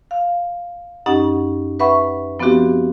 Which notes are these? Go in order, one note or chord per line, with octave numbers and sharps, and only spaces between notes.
F5
F#2 C#4 D#4 G4 D#5 F#5
B4 E5 F#5 B5 C#6
F3 B3 C4 D4 F#4 G4